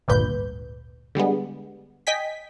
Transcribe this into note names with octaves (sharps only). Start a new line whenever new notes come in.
G#1 D2 G2 A#2 B4 G6
D3 G3 G#3 B3
D#5 G5 G#5 B6